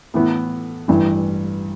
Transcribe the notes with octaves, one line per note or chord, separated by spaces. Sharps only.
A2 E3 B3
A1 G2 E3